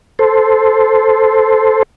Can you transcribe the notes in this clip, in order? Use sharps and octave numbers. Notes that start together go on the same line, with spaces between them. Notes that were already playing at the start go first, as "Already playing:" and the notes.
A4 C5